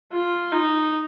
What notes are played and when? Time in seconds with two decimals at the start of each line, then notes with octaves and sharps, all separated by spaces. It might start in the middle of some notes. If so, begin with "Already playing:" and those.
0.12 F4
0.51 D#4